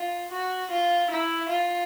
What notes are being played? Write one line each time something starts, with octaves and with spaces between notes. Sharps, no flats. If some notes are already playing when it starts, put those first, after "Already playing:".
Already playing: F4
F#4
F4
E4
F4